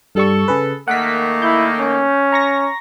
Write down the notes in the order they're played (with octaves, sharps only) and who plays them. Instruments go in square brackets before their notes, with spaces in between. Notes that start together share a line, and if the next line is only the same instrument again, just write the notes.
[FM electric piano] G2 G3 C#6 [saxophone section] A4
[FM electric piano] C#3 G#4 B4
[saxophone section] D#3 A3 A#3 [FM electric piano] F#5 B6
[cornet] E4 [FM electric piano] G6
[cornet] C#4
[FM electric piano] A#5 C#6 A#6